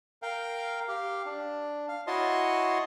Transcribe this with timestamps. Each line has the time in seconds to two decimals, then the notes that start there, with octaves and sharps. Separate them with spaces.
0.22 A#4 F5 G5
0.88 G4 F5
1.25 D4
1.89 F5
2.07 E4 F#4 C#5 D#5 A5 C6